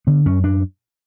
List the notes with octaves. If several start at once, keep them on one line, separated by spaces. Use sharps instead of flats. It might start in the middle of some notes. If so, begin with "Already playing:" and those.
D3 B3
F#2 C#4
F#2 D4